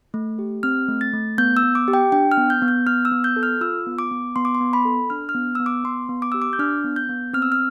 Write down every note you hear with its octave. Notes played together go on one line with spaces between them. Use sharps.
A3
G4
C4 F6
A3
A6
A3
B3 G6
E6
B3
D6
G4
G5
D4 G5
F6
B3
G6
B3
G6
B3 F6
E6
B3
G6
A4
F6
F4 E6
B3
D6
B3
B3 C6
D6
C6
B3
B5
A4
D4 F6
F6
B3
B3 E6
D6
B3 C6
B3
D6
G4 E6
D6
G6
D4 F6
B3
G6
B3
C4 F6
E6
F6